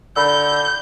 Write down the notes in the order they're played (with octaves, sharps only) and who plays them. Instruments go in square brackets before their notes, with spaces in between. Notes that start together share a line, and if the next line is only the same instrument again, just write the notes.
[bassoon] D3 [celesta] B5 E6 [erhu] G6